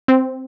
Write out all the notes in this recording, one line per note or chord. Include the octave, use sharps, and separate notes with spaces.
C4